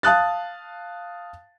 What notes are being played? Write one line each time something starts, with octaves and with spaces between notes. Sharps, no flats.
F5 A5 D#6 F#6 A6